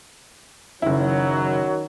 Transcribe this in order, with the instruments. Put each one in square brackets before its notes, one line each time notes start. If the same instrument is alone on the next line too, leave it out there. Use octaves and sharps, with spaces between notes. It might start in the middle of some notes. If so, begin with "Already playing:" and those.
[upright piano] F#1 E4 [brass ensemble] D#3 F#3